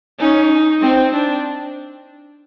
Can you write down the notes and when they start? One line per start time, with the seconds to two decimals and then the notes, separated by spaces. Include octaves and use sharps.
0.19 C#4 D#4
0.81 C4
1.13 D4